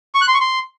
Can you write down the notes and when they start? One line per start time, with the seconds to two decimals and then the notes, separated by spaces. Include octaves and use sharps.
0.15 C#6
0.21 F#6
0.28 C6
0.34 C#6
0.41 C6